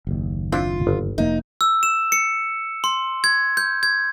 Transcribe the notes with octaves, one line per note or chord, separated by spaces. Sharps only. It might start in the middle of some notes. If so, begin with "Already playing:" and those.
F#1 D#2
C4 D4 E4 F4
G1
F1 A#3 D#4
E6
E7
C#7
C6
G#6
G6
G#6